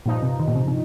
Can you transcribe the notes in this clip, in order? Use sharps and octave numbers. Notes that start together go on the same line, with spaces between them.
G2 A#2 F3 D#4
C3
D#3
A#2
C3
C3